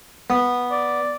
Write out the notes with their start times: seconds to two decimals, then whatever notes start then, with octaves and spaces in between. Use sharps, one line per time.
0.30 B3
0.71 D5